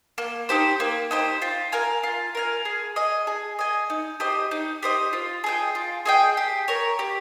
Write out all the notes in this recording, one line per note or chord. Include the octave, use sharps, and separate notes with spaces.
A#3
D#4 G4 C5
A#3
D#4 G4 C5
F4
A#4 F5 G#5
F4
A#4 F5 G#5
G#4
D#5 G#5
G#4
D#5 G#5
D#4
G4 C5 D#5
D#4
G4 C5 D#5
F4
G#4 D#5 G5
F4
G#4 D#5 G5
G4
A#4 C#5
G4